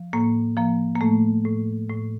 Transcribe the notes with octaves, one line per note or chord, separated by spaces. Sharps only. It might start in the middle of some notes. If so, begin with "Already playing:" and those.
Already playing: F3
A2 A#3
F3 A#3
A#3
A2 A3
A2
A2